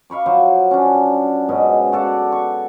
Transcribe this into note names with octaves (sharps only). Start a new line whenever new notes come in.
F5 B5 C#6 D6
F3 F#3 C5
C#4 D4
G#2 B2 C#4 D#5
F#4 A4 D5 F#5
C#6